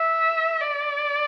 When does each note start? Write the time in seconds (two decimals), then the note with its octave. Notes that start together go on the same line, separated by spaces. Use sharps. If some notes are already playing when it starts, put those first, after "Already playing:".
Already playing: E5
0.61 D5